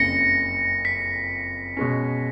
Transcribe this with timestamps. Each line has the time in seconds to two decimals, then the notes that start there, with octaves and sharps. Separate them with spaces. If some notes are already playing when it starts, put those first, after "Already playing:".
Already playing: F#1 F2 C#3 A#6 C#7
0.85 B6
1.77 B2 G#3 C#4